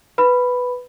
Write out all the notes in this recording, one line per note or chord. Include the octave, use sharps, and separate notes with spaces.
B4 B5